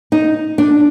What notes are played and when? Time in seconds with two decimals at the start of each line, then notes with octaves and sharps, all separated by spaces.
0.12 D#4
0.58 D4